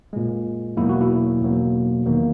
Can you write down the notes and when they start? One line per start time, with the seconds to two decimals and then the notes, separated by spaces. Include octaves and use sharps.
0.13 A#2 G#3
0.77 E2 B2 F#3 A#3 E4
0.89 F#4
1.01 E4
1.41 E2 B2 F#3 A#3
2.06 E2 D#3 F#3 A#3